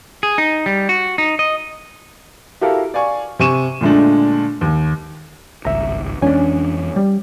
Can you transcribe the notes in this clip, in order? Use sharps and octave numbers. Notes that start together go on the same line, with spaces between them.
G#4
D#4
G3
F#4
D#4
D#5
E4 F#4 G4 A4 A#4 F5
D5 F5 G#5 C#6
C3 G#5 C#6 D#7 E7
A#2 D3 G#3 A3 D4
D#2
G#1 C#2 G2 E5 A#5
F2 E3 G#3 C#4 D4 G#5
G3